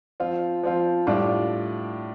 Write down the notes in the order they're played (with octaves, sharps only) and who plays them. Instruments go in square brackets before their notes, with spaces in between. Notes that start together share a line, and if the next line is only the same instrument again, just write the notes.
[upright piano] F3 C4 F4
F3 C4 F4
A2 G3 D4 F4